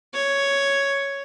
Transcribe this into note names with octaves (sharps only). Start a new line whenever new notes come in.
C#5